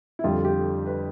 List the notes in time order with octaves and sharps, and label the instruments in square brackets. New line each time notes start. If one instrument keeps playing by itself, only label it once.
[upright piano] E4
F2 D3 G3 F4
G4
B4